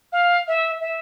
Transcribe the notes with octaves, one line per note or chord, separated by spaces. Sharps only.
F5
E5
E5